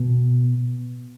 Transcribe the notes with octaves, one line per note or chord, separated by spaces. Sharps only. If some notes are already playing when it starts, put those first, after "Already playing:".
Already playing: B2